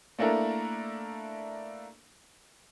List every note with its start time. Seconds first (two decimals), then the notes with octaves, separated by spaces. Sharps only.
0.18 A3 A#3 D4 E4 A4 A#4